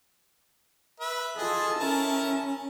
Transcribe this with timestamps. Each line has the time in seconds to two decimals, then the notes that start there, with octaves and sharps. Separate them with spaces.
1.00 B4 E5
1.38 F4 G#4 A4 D#5
1.79 C#4 E4 A#4 A5